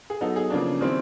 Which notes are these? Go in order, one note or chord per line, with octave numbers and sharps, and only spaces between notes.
G#4
F#3 B3 D#4 A4
G#4
C#3 F3 A#3 D4
D#3 G3 C4 E4